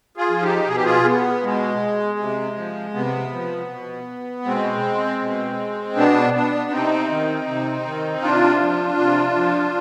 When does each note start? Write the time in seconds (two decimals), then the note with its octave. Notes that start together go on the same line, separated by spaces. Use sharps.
0.17 F4 G#4
0.30 F3
0.42 D#4 G4
0.68 B2 G#4
0.76 G4
0.85 F4 G#4
1.05 B3
1.43 B2 G#3
2.19 C3
2.56 F3
2.94 C3 B3
3.32 F3
3.69 B2
4.45 B2 G#3 C4
5.21 B2
5.96 B2 B3 D4
6.34 B3 D4
6.71 C3 C4 D#4
7.09 D#3
7.47 C3
7.85 D#3
8.22 C3 D4 F4
8.60 F3
8.98 C3
9.36 F3